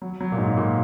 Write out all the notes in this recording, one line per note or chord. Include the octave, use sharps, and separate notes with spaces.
F#3
F#3
A#2
G#2
A#2